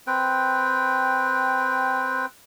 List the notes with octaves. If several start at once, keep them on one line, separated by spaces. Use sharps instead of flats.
C4 B4 G5